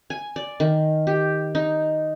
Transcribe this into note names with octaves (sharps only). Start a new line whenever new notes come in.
G#5
D5
D#3
G4
D#4